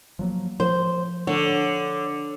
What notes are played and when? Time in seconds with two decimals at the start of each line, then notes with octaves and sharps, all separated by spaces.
0.19 F3 F#3 A#3
0.60 F3 C5
1.27 D3 C#5